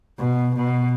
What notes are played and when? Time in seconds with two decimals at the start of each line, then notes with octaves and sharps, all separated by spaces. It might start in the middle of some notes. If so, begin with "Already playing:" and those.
0.19 B2
0.56 B2